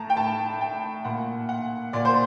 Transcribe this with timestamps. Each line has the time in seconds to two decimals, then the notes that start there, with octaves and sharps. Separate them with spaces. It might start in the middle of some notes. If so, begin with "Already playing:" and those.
Already playing: A2 A5 A#5
0.10 G5
0.16 A2 A5
0.61 G5
1.05 A#2 F#5
1.49 F#5
1.93 A#2 D5
2.05 C5